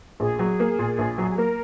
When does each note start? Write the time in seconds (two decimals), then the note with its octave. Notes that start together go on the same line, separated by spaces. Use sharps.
0.19 A#1 G#4
0.39 F#3
0.60 A#3
0.79 A#2
0.99 A#1
1.18 F#3
1.29 G#4
1.38 A#3 A#4